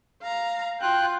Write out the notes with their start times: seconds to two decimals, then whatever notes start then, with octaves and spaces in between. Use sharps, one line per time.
0.23 F5 A#5
0.81 F4 G5 F#6